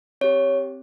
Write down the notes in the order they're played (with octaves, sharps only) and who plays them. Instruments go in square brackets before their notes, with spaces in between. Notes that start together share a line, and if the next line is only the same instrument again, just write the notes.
[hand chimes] C4 G4 C#5